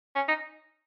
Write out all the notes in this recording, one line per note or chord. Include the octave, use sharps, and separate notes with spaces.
C#4
D#4